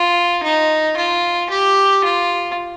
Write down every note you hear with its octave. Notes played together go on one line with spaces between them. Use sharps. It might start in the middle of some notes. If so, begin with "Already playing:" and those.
Already playing: F4
D#4
F4
G4
F4